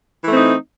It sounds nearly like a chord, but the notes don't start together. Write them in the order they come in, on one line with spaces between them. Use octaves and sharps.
E3 A3 C4 D#4